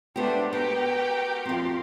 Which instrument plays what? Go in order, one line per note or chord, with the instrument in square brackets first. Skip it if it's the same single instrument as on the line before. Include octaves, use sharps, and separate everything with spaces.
[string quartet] G#3 A3 D4 [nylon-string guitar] B3 G4 [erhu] C5
[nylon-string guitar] B3 [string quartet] F#4 G4 A#4 [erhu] G5
[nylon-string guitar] F2 C4 [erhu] C6